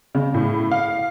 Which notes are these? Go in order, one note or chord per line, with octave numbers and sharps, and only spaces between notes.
C#3
A2
F5